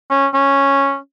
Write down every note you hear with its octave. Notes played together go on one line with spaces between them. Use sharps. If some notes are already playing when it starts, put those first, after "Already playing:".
C#4
C#4